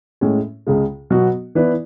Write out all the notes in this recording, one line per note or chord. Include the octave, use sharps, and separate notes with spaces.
A2 G#3 C#4
C#2 C#3 G#3
B2 F#3 B3 F#4
E3 B3 E4 B4 D5